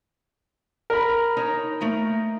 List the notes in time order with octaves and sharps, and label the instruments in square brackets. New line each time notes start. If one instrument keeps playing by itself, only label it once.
[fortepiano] A#4 B5
[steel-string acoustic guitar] D#4 C#5 A5
A3 A#3 D#4